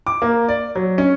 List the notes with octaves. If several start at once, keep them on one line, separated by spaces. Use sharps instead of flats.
D6
A#3
D5
F#3
C#4